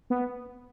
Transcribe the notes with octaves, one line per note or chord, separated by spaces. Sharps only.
B3